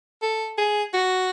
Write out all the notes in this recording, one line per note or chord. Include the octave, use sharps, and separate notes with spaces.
A4
G#4
F#4